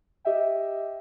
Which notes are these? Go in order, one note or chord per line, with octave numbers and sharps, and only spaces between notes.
G4 D#5 E5 G5